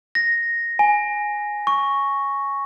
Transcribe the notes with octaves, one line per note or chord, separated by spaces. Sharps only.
A#6
G#5
C#6